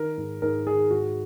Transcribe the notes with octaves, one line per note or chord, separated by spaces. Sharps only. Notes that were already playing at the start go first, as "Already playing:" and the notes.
Already playing: D#3 A#4
G#2
G#2 A#4
D#3 G#4
G#2 F#4